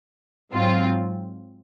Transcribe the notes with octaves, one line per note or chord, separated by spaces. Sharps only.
G#2 F#3 C4 F4